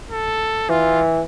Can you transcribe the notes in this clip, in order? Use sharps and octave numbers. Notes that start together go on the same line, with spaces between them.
A4
E3 F4